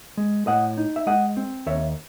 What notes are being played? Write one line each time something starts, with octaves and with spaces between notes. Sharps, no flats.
G#3
A2 D#5 F#5
D#4
E5
G#3 D#5 F#5
C4
D#2 C#5 E5